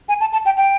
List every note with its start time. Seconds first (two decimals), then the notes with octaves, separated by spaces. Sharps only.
0.09 G#5
0.20 A5
0.32 A5
0.46 G5
0.57 G5